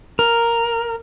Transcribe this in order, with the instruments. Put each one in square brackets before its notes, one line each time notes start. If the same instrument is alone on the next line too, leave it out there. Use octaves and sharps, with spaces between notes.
[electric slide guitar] A#4